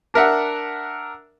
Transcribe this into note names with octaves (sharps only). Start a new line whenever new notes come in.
D4 A#4 E5 F#5